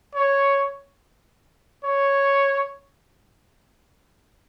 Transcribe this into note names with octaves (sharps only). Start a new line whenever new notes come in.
C#5
C#5